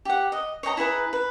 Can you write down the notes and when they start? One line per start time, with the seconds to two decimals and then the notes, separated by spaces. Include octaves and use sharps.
0.05 G4 F#5
0.32 D#5
0.63 C#5 D#5 G5 A#5
0.77 E4 G#4 B4 A#5
1.13 B4